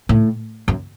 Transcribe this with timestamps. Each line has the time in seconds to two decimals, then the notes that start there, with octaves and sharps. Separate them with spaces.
0.09 A2
0.68 F#2